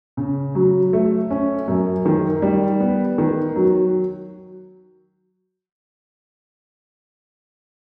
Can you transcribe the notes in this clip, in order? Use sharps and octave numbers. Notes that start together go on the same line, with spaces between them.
C#3
F#3
A3
C#4
F#2
D#3
G3
B3
D#3
F#3